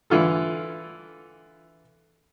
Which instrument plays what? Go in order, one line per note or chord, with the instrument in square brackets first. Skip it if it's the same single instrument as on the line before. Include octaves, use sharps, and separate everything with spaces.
[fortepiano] D3 E3 F4 A4